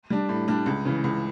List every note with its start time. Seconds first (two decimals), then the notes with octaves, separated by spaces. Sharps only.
0.10 G3 D4
0.29 A2
0.48 G3 D4
0.66 C#2
0.85 C#3 E3
1.04 C#2